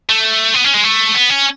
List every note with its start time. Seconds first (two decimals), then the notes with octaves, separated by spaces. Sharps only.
0.09 A3
0.54 B3
0.64 C#4
0.74 G#3
0.84 A3
1.14 B3
1.30 C#4